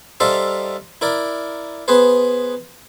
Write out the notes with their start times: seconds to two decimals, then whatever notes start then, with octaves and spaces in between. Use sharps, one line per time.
0.20 G3 D#4 A4 C5 E5 F5
1.01 E4 A#4 D5
1.88 B3 G#4 B4 C5